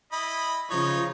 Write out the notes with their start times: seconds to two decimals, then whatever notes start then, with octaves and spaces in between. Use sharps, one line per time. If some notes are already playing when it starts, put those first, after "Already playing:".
0.12 E4 D#5 B5
0.70 C#3 F3 D#4 C#5